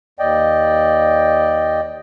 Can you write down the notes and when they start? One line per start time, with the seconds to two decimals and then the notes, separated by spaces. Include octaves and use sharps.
0.19 D#2 D5 D#5 G5